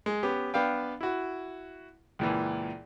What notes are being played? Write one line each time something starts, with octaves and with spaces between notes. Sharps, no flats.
G#3
B3 C#4 G4
B3 D4 F5 G5
E4 F#4
C#2 A#2 E3